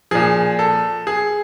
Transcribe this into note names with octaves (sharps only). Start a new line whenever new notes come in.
A#2 F3 G#4
A4
G#4